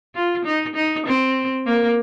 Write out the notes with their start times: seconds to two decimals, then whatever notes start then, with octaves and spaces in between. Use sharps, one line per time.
0.15 F4
0.45 D#4
0.75 D#4
1.06 C4
1.65 A#3